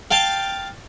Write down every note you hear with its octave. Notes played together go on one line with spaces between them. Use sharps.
F5 G5 A5